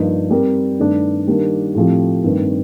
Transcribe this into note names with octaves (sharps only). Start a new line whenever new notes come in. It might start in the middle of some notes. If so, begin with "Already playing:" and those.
Already playing: G2 F3 A#3 D#4
G3 C4 G4 A#4
G2 D#3 A3 D4
D#3 G3 A#3 D4
A2 F3 C4 G4
G2 D#3 A3 C4